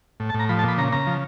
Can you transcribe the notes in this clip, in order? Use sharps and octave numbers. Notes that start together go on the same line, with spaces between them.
A2
A5
A2
A#5
F3 B5
A5
A#2 B5
C#3 A#5
C#3 A#5
F3